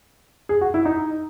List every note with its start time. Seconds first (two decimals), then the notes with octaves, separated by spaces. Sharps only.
0.49 G#4
0.61 F#4
0.74 E4
0.85 D#4